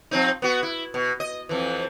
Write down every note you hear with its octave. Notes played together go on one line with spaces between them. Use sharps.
F3 C4 D#4
B3 F#4
E4
B2
D#5
F2 E3